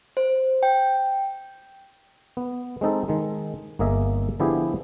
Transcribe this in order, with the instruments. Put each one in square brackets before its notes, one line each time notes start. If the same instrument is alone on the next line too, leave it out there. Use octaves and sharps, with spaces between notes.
[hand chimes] C5
G5
[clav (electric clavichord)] B3
G#3 C4 D#4 A4
D#3 G#3
G1 A#3 G#4 D#5 E5
D3 F3 B3 E4 G4 G#4